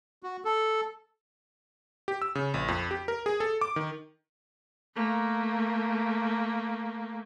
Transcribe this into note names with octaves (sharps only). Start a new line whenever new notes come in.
F#4
A4
G4
E6
C#3
A#1
F2
G4
A#4
G#4
A4
D6
D#3
A3 A#3